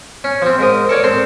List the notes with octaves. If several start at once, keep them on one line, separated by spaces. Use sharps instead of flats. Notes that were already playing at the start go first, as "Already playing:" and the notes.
C#4
F3 C4
G#2 A#4 D#6
A4 A#4 C#5 D5
C4 A4 C6